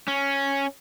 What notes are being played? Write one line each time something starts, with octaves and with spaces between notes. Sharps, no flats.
C#4